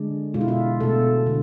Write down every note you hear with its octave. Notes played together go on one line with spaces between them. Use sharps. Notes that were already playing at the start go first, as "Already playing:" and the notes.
Already playing: D3 G#3 D4
B2 G#3 F4
E4
F4
B2 A3 A4
D3